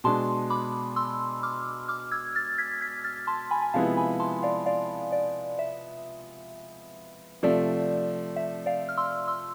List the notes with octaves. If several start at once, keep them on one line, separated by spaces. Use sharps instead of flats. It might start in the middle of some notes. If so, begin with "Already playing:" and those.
B2 G#3 D4 A5 C6
B5 D6
C6 E6
D6 F6
D6 F6
E6 G#6
F6 A6
G#6 B6
G#6 B6
F6 A6
A5 C6
G#5 B5
G#5
C3 F3 G#3 B3 E4 F5 A5
G#5 B5
A5 C6
D5 F5
D5 F5
D5
E5
C3 F3 A3 D5
E5
D5 F5
F6
C6 E6
C6 E6